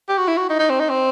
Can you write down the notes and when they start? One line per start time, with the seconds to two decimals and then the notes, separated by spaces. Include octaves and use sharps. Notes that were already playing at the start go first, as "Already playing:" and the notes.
0.09 G4
0.18 F#4
0.28 E4
0.37 F#4
0.49 D#4
0.59 D#4
0.69 C4
0.80 D#4
0.89 C4